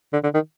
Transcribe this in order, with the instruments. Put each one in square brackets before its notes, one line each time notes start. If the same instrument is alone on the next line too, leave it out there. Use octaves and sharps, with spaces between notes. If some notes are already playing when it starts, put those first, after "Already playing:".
[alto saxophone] D3
D3
D#3